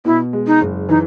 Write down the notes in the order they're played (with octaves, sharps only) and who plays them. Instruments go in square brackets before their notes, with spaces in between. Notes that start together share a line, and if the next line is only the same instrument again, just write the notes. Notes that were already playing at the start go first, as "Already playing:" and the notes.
[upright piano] B2 [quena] E4
[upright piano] G#3
[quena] D#4
[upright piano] F#1
[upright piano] E3 [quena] D#4